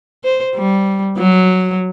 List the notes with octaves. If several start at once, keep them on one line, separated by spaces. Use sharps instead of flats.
C5
G3
F#3